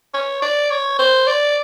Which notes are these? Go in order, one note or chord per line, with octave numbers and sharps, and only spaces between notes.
C#5
D5
C#5
C5
D5